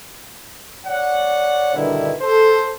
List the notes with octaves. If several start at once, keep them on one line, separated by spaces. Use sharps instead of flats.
C#5 D5 F#5
G2 B2 D3 D#3 E4
A4 C5